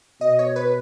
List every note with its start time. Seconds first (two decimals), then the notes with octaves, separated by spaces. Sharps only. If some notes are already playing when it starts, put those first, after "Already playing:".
0.21 B2 D#5
0.39 C#5
0.56 B4